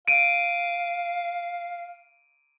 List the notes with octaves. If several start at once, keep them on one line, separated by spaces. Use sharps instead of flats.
F5 D7 D#7